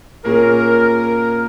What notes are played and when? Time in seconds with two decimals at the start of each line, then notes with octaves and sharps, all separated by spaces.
0.25 A#2 A#3 C#4 G#4 A#4